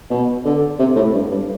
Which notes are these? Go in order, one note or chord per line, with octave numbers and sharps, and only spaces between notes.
B2
D3
C3
A2
G2
G2